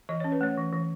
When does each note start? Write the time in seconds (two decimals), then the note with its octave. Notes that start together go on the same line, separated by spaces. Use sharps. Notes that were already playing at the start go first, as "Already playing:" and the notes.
0.09 E3 D#5
0.20 C#4 C#5
0.32 B4
0.41 A3 C#5
0.57 E3
0.73 E3